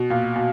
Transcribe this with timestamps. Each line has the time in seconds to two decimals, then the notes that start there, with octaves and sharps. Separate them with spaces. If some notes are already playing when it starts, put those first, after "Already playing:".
Already playing: B2
0.10 A#2
0.36 B2